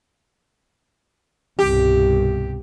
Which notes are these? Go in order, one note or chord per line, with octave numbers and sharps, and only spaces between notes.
C2 G2 B2 G4